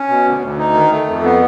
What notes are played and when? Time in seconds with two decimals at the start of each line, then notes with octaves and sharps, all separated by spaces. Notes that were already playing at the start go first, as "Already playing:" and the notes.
Already playing: C#4
0.09 B2
0.25 D2
0.41 D2
0.58 D#4
0.74 D#3
0.90 A3
1.07 F2
1.23 B3